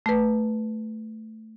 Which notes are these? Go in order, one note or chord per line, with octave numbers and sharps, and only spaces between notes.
A3 B4